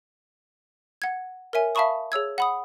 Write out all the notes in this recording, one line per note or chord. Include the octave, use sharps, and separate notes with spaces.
F#5 G#6
A#4 C#5 E5 G#5
E5 F5 A5 B5 C#6 D#6
G#4 C#5 E6 G#6
F#5 B5 D#6